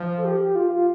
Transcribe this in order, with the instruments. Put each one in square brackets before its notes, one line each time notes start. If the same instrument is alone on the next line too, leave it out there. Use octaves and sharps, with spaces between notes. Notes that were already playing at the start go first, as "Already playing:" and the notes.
Already playing: [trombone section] F3
[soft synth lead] A4
G4
G4
F4
F4